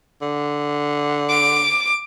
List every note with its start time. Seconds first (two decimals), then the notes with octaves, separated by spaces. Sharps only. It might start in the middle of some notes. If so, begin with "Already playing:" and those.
0.22 D3
1.30 D6